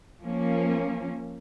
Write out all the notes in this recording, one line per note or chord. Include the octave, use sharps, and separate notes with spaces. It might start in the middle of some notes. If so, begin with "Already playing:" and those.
F3 A#3 C#4